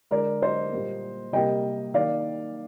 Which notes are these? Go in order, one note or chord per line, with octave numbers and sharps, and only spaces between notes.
D3 G#3 A#4 D5
C5 D#5
A#2 G3 A#3
C3 G3 A#3 D#5 G5
D#3 A#3 D5 F5